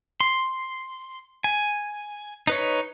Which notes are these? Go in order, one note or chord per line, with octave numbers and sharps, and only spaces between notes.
C6
G#5
D#4 B4 C#5